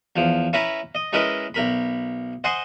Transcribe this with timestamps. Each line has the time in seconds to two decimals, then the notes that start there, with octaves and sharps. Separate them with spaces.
0.16 E2 F3
0.53 C#4 E4 B4 A#5 B5
0.95 D#5
1.13 G#3 C#4 E4 A#4 B4 D#5
1.54 B1 A#4 B5
2.44 C5 D#5 F#5 G#5 C6